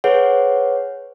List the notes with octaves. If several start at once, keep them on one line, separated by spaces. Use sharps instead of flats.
G#4 B4 C#5 F#5